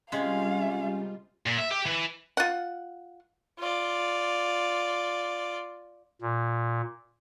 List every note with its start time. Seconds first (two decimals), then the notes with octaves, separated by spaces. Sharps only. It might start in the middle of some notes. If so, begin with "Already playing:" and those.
0.12 C3 G3 G#3 C#4 F4 F5
1.46 A#2
1.58 E5
1.71 G4
1.85 E3
2.37 F4 F#5
3.59 F4 D5
6.22 A#2